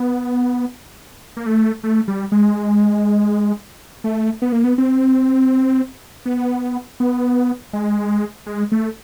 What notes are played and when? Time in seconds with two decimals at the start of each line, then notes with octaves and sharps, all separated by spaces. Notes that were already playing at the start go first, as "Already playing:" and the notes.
Already playing: B3
1.37 A#3
1.46 A3
1.84 A3
2.08 G3
2.32 G#3
4.04 A3
4.42 B3
4.52 A#3
4.64 B3
4.78 C4
6.26 B3
7.00 B3
7.73 G#3
8.46 G#3
8.72 A3